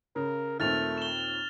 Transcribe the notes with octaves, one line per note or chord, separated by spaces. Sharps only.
C#3 A#4
D#2 A#2 A3 C4 F6 A6 F7
E7 G7